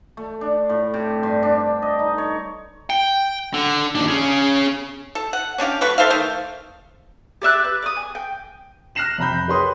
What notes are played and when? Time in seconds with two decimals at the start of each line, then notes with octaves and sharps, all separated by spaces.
0.17 A3
0.41 D4
0.69 A2
0.94 C3
1.23 G2
1.43 D4
1.82 D#5
1.99 D#4
2.18 C#5
2.90 G5
3.54 D3
3.95 D#2 D4
4.08 C#4 G#4
5.15 A4
5.33 F#5
5.58 C#4 D4 G4 F5
5.81 F#3 A3 B4 C#6
5.98 A4 C5 E5 F5
6.11 D#3 A3
7.42 G4 D5 E5 F#6
7.64 B4
7.82 D5 D#6
7.97 G#5
8.15 G5
8.95 F6 F#6 A#6 C7 E7 F#7
9.18 F2 C3 A#5 B5 G6
9.48 G4 G#4 B4 C#5 C6 D#6